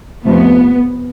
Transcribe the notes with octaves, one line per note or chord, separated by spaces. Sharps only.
F2 C3 F3 A3 B3